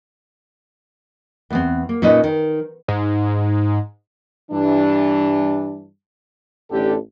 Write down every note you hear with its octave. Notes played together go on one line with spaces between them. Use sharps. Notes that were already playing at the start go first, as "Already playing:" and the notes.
E2 B3 C4
A#3
A#2 C#4 D#4 B4 D#5
D#3
G#2
G2 E3 D4
A1 D3 G4 A4